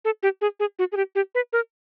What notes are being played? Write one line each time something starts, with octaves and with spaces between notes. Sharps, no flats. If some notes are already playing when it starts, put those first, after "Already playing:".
A4
G4
G#4
G#4
F#4
G#4
G4
G4
B4
A#4